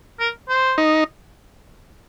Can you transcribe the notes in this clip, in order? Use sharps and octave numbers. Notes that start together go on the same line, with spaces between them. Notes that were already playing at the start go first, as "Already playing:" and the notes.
A#4
C5
D#4